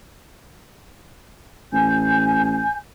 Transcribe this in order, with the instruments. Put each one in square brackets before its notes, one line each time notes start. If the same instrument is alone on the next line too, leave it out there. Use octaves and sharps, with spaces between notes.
[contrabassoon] A1 [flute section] G#5 G6